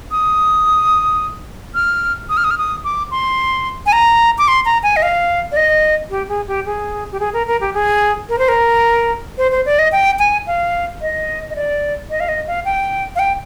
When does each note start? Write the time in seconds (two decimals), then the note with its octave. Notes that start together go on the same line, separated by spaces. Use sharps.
0.11 D#6
1.75 F6
2.29 D#6
2.37 F6
2.44 D#6
2.51 F6
2.58 D#6
2.84 D6
3.11 C6
3.86 G#5
3.92 A#5
4.38 D6
4.48 C6
4.65 A#5
4.83 G#5
4.96 D#5
5.02 F5
5.52 D5
5.57 D#5
6.10 G4
6.29 G#4
6.47 G4
6.66 G#4
7.12 G4
7.20 G#4
7.33 A#4
7.47 A#4
7.61 G4
7.74 G#4
8.29 A#4
8.39 C5
8.48 A#4
9.38 C5
9.52 C5
9.66 D5
9.79 D#5
9.92 G5
10.19 G#5
10.47 F5
11.01 D#5
11.50 D#5
11.56 D5
12.10 D#5
12.20 F5
12.28 D#5
12.47 F5
12.65 G5
13.16 F5
13.19 G5